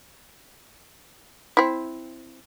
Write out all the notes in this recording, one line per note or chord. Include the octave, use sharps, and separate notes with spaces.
C4 E4